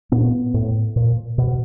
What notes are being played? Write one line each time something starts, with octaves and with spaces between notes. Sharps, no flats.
A#2 B3
A2
A#2
B2